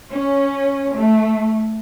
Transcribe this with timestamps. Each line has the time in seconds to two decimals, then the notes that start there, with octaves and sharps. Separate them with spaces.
0.11 C#4
0.95 A3